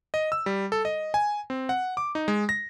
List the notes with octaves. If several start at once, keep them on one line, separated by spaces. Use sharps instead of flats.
D#5
E6
G3
A4
D#5
G#5
C4
F#5
D6
D#4
G#3
A#6